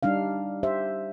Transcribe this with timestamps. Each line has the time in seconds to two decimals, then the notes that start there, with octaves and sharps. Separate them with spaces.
0.03 G3 D4 D#4 F5
0.63 G4 C5 E5